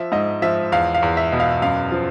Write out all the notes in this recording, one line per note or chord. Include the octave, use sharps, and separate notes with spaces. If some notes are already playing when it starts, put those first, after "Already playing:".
Already playing: F3 E5
G#2 D#5
F3 E5
E2 F5
F5
E2
E5
B2
F5
F#2 F5
F3